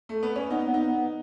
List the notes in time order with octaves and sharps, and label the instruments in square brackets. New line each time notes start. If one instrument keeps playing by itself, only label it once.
[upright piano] A3
B3
C#4
[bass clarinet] B3 [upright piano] D#4
[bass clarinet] B3
[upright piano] D#4
[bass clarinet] B3